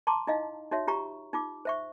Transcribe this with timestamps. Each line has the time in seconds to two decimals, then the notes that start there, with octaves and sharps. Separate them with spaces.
0.07 A5 A#5 C6 D6
0.27 D#4 E4 D#5 F5
0.71 D#4 F#4 C#5 E5
0.87 F4 G4 A#5 C#6
1.33 D#4 F4 D6
1.65 C5 E5 C#6